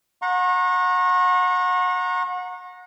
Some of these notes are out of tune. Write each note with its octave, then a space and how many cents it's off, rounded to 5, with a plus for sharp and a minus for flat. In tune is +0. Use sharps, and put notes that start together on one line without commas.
F#5 -30 A#5 +0 C#6 -40